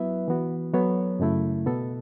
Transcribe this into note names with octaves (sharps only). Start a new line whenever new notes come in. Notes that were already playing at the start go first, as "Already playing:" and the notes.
Already playing: F#3 B3 E4 B4 E5
E3 B3 F#4
F#3 B3 A4 C#5
F#2 C#3 A3 E4
B2 B3 A4